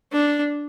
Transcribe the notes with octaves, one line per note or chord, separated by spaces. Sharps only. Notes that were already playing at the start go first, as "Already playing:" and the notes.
D4